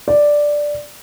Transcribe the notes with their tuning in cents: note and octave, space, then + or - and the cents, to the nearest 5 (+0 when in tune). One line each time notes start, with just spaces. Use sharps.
D5 +0